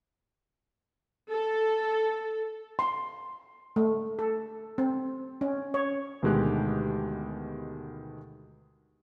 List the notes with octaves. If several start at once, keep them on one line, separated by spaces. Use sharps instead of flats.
A4
C6
A3
A4
C4
C#4
C#5
D2 B2 D#3 G#3 G4 F#6